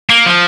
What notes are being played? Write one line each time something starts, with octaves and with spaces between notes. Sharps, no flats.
A#3
F3